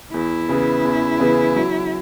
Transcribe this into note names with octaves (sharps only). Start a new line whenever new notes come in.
E2 E4
C#3 E3 B3 G#4
E2
C#3 E3 B3 G#4
F#3